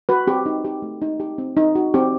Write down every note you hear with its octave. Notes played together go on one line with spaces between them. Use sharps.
F#4 B4
C4 G4
D#4
G4
A3
D#4
G4
C4
D#4
F#4
C4 G4